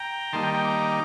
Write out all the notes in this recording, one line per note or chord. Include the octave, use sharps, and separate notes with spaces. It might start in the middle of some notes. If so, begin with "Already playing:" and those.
Already playing: G5 A#5
D#3 G3 A#3 D#4 A5 C6
G5 A#5
G5 A#5
A#5 D6